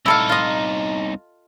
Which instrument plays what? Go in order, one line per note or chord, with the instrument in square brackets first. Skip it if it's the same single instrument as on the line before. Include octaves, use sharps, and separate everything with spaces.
[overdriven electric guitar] C2 D#4 [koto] E4 A4 F5
[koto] F4 D#5